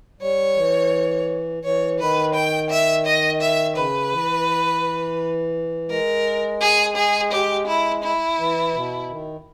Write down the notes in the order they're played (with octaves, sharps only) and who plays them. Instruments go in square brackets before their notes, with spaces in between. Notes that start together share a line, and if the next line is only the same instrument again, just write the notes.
[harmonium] G3 [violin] C#5
[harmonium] E3
[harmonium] E3 [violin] C#5
[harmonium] D#3 [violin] B4
[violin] G5
E5
D#5
E5
[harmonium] C#3 [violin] B4
[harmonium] E3
[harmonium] G#3 [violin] A#4
[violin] G#4
G#4
G4
E4
E4
[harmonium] E3
B2
D#3